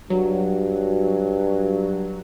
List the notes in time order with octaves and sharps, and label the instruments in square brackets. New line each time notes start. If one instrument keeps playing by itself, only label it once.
[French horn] G2 [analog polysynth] F#3